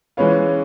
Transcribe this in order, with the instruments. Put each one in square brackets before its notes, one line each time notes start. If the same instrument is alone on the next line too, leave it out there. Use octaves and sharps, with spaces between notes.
[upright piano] E3 G#3 C#4 F4 B4 C#5